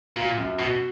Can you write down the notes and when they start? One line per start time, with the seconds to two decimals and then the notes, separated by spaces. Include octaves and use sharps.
0.16 A#2 F4
0.38 F#2
0.59 B2 F#4